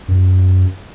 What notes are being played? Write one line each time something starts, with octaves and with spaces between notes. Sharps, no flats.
F#2